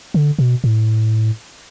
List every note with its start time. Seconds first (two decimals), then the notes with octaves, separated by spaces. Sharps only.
0.14 D3
0.39 B2
0.64 A2